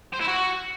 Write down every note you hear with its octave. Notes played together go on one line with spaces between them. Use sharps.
C5
E4
F#4